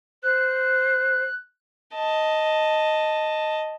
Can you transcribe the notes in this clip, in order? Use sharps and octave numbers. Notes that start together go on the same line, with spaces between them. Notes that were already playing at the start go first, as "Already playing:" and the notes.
C5 F#6
D#5 A5